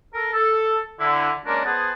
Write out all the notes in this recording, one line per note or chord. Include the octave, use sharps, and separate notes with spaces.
A4 A#4
A4
D3 E4
G#3 A#3 C#4 D4 F#4 A#4
B3 G#4 C5 F#5 G#5 A5